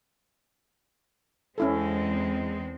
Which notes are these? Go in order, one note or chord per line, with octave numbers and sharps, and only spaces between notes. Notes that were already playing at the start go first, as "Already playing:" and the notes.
E2 G#3 C4 C#4 E4 A4